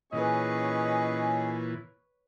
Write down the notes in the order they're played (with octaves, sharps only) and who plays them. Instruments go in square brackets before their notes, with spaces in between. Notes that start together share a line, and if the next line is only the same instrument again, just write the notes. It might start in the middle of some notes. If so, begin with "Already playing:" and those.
[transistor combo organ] A#2 E3 [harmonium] C#4 G#4 [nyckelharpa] B4 C#5 [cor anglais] D#5